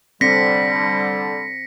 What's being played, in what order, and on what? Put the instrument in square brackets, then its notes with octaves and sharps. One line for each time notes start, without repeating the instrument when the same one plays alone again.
[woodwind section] D3 G3 [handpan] C4 [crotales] A#6 C#7 [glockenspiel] B6